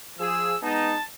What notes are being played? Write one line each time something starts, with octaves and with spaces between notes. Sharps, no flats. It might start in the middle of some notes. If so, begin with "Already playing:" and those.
F3 G#4 E6
G#3 B3 D#4 A5